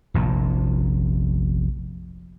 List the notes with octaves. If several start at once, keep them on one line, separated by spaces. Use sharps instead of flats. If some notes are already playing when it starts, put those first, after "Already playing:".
F1 A#1 A#2